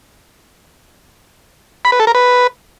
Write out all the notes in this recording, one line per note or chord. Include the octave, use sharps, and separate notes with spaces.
B5
B4
A4
A#4
B4